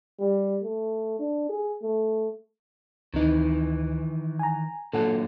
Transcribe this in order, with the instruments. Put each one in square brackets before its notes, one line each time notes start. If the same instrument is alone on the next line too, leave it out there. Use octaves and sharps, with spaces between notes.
[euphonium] G3
A3
D4
G#4
A3
[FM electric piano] D2 C4 D#4 [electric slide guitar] D#3 E3
[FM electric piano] G#5 A#5
[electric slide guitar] A#2 D3 F#3 [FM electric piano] A4 F#5